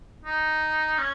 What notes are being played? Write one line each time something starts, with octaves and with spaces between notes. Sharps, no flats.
D#4
C#4